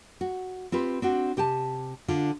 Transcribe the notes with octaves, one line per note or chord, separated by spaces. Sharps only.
F#4
C4 F4 G4 B4
C4 D4 F#4
C3 G4 G#5 A5
D3 D4 F4